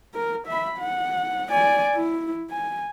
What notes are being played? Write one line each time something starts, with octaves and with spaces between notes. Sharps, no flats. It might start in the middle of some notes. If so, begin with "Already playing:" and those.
A#4
E5 B5
F#5
D5 G#5
E4
G#5